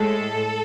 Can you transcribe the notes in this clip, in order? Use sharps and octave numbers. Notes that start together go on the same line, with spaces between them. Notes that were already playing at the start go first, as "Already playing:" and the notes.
Already playing: A2 G#3 A4